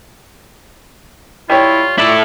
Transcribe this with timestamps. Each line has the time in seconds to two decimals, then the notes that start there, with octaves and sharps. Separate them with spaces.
1.50 G3 E4 F4 C#5
1.98 A#2 E4 A4 D5